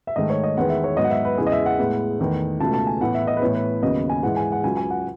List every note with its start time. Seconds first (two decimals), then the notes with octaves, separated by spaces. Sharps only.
0.07 E5
0.16 G#2 D#3 A3 D#5
0.30 C#5
0.43 D#5
0.57 E2 D#3 G#3 B3 F#5
0.70 E5
0.84 C#5
0.97 G#2 F#3 B3 D#5
1.04 F#5
1.11 E5
1.25 B4
1.38 E2 C#3 E3 G#3 G#4
1.47 D#5
1.52 E5
1.66 F#5
1.79 A2 G#3 B3
2.19 E2 D#3 A3
2.60 C#2 B2 A3 A5
2.74 A5
2.87 G#5
3.01 A2 E3 B3 F#5
3.15 E5
3.27 D#5
3.37 B4
3.42 A2 E3 B3 C#5
3.55 B4
3.82 D#2 C#3 F#3 B3 D#5
4.10 G#5
4.23 G#2 E3 G#3 F#5
4.37 G#5
4.52 F#5
4.64 C#2 C#3 F#3 G#5
4.77 G#5
4.90 F#5